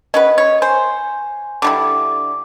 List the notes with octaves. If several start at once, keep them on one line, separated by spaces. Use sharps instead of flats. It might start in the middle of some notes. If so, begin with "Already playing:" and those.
C#4 F#4 B4 D#5
C#5
C5 G#5
D3 G3 E4 D6